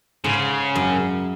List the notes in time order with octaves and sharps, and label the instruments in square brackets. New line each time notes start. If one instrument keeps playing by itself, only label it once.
[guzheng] G#2 [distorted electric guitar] C#3
[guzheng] F#2